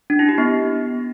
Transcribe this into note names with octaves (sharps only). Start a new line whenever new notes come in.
D4
E4
G4
B3